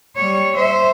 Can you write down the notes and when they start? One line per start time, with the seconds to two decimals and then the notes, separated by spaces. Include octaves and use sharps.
0.16 G3 C#5
0.56 C5 E5